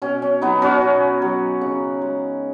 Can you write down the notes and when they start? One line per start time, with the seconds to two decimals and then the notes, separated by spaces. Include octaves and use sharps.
0.02 B2 C#4
0.22 C#4
0.42 F#3 B3 D#4
0.62 C#4 F#4
0.82 B2
1.22 F#3
1.61 C#3
2.02 G#3